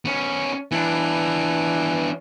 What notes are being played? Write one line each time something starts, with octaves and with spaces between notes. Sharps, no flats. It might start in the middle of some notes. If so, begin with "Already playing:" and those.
B3 C#4
E3 B3 D4